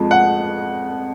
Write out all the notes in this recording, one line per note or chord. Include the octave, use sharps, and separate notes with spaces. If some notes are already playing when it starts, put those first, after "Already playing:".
Already playing: F2 F3 G#3
F#5